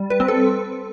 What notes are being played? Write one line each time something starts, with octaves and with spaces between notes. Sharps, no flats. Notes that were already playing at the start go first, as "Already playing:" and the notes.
Already playing: G3
B4
C4
A4